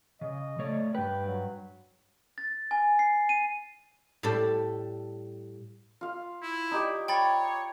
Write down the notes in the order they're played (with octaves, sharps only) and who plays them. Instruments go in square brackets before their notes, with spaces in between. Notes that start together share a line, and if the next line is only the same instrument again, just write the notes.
[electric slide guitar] C#3 [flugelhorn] D#5
[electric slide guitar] A3 C#5 D5
[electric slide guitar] G2 B4 [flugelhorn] G5
[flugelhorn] F#3
[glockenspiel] A6
G#5
C7
D#7
[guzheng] A2 G3 A4 D5 A5
[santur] F4 F5
[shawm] E4
[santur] D#4 G4 D5
[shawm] C#5 [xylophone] G5 B5 A6